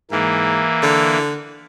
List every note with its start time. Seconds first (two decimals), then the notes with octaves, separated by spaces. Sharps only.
0.11 G#2 E3 A#3
0.83 D3